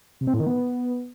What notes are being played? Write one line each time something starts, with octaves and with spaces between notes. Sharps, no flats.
C3
C4
A2
D#3
B3